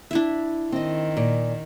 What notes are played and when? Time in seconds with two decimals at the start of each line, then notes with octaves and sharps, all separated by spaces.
0.11 D4 E4 E5
0.72 D#3 C4 D#5
1.17 A#2